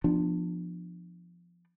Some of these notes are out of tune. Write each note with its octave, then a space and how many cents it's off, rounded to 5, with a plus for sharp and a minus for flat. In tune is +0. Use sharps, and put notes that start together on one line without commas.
F3 -5 B3 +0 D4 +20